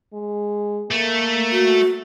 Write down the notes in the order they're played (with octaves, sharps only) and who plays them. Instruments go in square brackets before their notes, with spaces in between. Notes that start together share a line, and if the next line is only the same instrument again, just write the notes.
[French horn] G#3
[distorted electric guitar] A3 [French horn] A#3
[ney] F#4